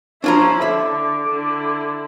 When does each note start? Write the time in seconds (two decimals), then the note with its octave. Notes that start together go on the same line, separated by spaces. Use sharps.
0.24 F3 D4 E4 F4 C#5 A#5
0.62 D3 E5 D6
1.29 D3 E4